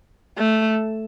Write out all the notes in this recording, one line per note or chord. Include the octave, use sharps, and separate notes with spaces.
A3